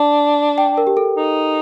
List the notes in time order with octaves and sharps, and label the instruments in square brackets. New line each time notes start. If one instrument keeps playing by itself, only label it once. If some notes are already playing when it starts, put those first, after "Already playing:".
Already playing: [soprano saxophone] D4 [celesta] A5
[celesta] G5
A#4
G4
A4
[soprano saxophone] D#4